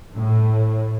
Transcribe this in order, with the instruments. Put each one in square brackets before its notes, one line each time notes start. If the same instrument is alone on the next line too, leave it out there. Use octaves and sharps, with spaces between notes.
[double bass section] A2